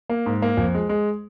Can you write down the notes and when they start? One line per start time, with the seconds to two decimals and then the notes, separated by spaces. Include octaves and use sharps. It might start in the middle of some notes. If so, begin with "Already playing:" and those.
0.09 A#3
0.26 G#2
0.42 A#3
0.57 F2
0.74 G#3
0.89 G#3